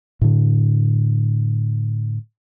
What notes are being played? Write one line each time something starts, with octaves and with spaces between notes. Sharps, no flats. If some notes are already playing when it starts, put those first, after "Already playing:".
A2 D3